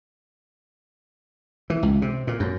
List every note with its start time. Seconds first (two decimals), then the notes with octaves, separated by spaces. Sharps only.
1.70 E3
1.83 C#2
2.02 C3
2.27 A#2
2.40 F#2